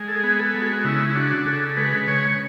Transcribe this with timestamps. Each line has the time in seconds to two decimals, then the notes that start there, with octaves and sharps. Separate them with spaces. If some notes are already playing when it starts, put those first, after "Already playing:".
Already playing: G#3
0.08 A4
0.16 G#4
0.23 B3
0.39 A4
0.54 G#3
0.61 F#4
0.84 C#3 E4
1.10 E4
1.15 D4 F#4
1.45 C#3 A4
1.77 G#3 B4
2.07 C#3 C#5